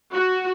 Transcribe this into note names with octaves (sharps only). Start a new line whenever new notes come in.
F#4